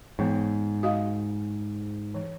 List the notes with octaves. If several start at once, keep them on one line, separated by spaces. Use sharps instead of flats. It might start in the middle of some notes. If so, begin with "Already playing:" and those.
G#2 E3 B3
F#4 D#5 F5
E3